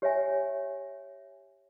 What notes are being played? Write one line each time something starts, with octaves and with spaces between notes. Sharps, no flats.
G4 C#5 E5 G#5